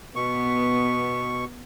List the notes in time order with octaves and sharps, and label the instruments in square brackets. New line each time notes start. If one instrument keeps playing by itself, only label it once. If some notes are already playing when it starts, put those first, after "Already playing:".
[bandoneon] B2 C#6 [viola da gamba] B3